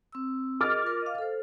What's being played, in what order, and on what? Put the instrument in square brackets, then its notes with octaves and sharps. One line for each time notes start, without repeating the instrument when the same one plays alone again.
[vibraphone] C4 E6
[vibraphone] G#4 A#4 D#5 [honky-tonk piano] D6 F6 A6
[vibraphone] F4 A#4
D#5 F5
A4 C5